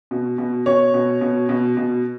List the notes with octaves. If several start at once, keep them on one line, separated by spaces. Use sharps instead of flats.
B2
B2
B2 C#5
B2
B2
B2
B2